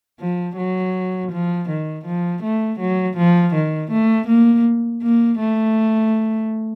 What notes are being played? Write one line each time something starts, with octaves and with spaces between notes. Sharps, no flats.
F3
F#3
F3
D#3
F3
A3
F#3
F3
D#3
A3
A#3
A#3
A3